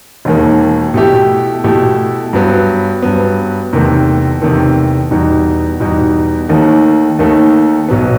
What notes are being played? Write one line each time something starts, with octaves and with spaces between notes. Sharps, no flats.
E1 D#2 D#3
B2 A3 E4 G4
B2 A3 E4 G4
G2 F#3 B3
G2 F#3 B3
E2 C3 D#3 A3
E2 C3 D#3 A3
E2 B2 G3 D#4
E2 B2 G3 D#4
D#2 D#3 A3 D#4
D#2 D#3 A3 D#4
B1 B2 F#3 B3